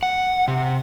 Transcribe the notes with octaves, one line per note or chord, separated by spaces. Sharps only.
F#5
C3